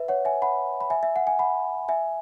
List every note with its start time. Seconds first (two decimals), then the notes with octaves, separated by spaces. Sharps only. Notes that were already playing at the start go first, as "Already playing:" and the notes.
Already playing: B4 E5
0.08 C#5 F#5
0.25 E5 G#5
0.42 F#5 B5
0.81 B5
0.90 E5 G#5
1.03 E5
1.16 F#5
1.27 G#5
1.39 F#5 B5
1.88 E5 G#5